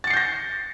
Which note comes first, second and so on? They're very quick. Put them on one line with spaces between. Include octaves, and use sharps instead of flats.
A6 C#7 C7 G6 A#6